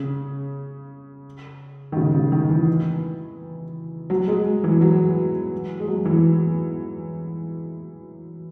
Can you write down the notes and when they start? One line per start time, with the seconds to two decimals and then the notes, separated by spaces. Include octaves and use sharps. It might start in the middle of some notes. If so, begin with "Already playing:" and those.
Already playing: C#3
1.92 D#3
1.97 C#3
2.14 C#3
2.32 D#3
2.50 E3
4.10 F#3
4.28 G#3
4.64 E3
4.81 F#3
5.80 G#3
5.88 F#3
6.05 E3